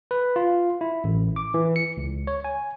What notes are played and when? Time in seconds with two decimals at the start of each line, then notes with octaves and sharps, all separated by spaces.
0.11 B4
0.36 F4
0.81 E4
1.04 A1
1.36 D6
1.54 E3
1.76 C#7
1.97 C#2
2.27 C#5
2.44 G#5